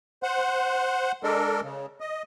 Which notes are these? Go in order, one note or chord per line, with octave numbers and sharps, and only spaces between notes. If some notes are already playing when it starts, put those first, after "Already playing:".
C5 F#5
G#3 D4 A4 A#4
C#3
D#5